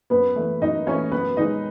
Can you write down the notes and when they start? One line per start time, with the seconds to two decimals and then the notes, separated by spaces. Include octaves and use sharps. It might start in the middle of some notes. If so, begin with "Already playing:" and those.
0.10 F#2 B3 B4
0.36 E3 A3
0.62 F#2 D#4 D#5
0.86 E3 A3 C#4 C#5
1.11 F#2 B3 B4
1.37 D#3 G#3 D#4 D#5